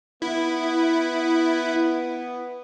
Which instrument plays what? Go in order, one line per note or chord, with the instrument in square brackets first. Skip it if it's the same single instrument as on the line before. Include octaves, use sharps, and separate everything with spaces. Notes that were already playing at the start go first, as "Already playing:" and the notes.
[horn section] B3 [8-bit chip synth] E4